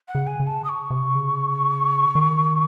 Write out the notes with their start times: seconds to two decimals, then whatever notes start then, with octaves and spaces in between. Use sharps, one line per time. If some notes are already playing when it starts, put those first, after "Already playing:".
0.08 F#5
0.15 C#3
0.27 G#5
0.40 C#3
0.47 A5
0.64 D#6
0.69 C#6
0.90 C3
1.15 C#3
2.15 D#3